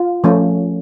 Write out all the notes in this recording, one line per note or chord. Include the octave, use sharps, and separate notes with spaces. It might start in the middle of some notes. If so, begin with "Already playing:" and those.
Already playing: F4
F3 A3 C#4